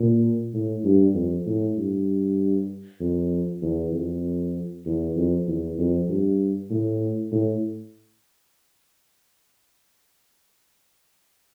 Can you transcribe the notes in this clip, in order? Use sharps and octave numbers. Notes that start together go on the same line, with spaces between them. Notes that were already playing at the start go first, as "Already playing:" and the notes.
Already playing: A#2
A2
G2
F2
A2
G2
F2
E2
F2
E2
F2
E2
F2
G2
A2
A2